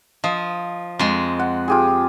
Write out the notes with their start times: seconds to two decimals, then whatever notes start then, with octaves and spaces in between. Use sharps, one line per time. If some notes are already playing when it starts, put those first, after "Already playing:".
0.24 F3 D#5
0.99 F2 G#3
1.39 F#5
1.68 F4 G4 G#4